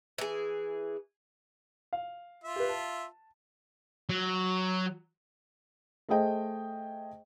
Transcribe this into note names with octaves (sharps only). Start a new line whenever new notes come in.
E3 G#4
F5
F4 E5
G4 B4
A5
F#3
A3 G#4 C5 D#5 G5